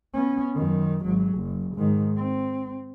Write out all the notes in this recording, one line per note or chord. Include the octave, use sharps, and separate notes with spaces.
B3 C#4
F#2 D#3
G#1 F#3
F#1
G#2 D#3
C4